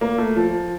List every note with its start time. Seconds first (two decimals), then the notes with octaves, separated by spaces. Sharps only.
0.01 A#3
0.18 A3
0.36 F3